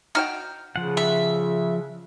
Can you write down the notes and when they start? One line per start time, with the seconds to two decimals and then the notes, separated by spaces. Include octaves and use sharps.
0.15 D#4 F#4 G5 F6
0.76 C#3 F3 F#5
0.97 G3 E5